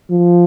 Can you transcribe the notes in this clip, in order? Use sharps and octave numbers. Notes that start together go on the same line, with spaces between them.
F3